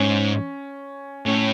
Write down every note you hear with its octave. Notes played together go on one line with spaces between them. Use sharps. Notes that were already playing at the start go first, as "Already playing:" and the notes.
Already playing: G#2 C#4
A2 C#4